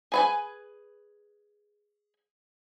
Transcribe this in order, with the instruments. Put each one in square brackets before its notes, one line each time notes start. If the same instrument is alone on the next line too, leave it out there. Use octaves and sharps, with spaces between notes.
[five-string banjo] G#4 B4 G#5